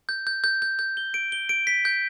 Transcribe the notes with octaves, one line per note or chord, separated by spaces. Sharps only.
G6
G6
G6
G6
G6
G7
D7
G7
D7
B6
G6